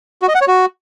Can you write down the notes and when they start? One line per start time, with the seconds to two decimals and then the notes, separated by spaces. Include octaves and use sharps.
0.22 F#4
0.28 D#5
0.35 F#5
0.41 C#5
0.48 F#4